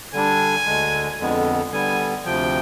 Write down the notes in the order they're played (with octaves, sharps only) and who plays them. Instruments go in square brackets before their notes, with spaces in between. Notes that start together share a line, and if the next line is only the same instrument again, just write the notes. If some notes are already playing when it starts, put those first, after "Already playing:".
[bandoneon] D3 G3 D4 [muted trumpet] G#5
[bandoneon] D2 D3 G#3
F2 D3 G#3 B3
[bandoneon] D3 G3 B3 [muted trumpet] G#5
[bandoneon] D2 C3 F3 [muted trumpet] G5